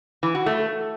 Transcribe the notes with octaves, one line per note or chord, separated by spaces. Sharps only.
E3
F#4
A3